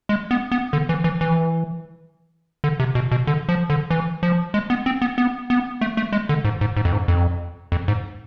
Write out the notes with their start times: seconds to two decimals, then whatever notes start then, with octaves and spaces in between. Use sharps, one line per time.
0.09 G#3
0.31 B3
0.51 B3
0.73 D3
0.89 E3
1.04 E3
1.21 E3
2.64 D3
2.80 C3
2.95 B2
3.12 B2
3.27 D3
3.49 F3
3.70 D3
3.90 E3
4.23 F3
4.54 G#3
4.70 B3
4.86 C4
5.02 B3
5.18 B3
5.50 B3
5.81 A3
5.97 A3
6.13 G#3
6.29 D3
6.45 G#2
6.61 G#2
6.76 G#2
6.85 F2
6.93 G#2
7.08 F2
7.72 F2
7.88 G#2